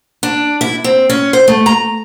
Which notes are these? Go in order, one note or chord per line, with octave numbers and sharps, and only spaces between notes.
D4
E4
C4
C#4
C5
A3
A#5